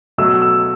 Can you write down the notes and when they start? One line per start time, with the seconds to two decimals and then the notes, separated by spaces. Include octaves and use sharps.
0.18 B2 F#3 A3 E6
0.42 E6